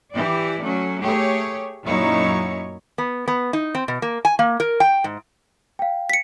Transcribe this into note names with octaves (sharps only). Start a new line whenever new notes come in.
E3 E4 G4 D5
F#3 A3 C#4
A3 G4 G#4 C#5
F#2 A#2 F#3 D#4 E4 C#5
B3
B3
D#4
C4
B2
A#3
G#5
A#3
A#4
G5
G#2
F5 G5
B6 C#7